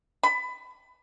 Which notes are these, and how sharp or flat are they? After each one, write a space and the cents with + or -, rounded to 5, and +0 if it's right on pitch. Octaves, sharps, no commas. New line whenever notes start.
B5 +20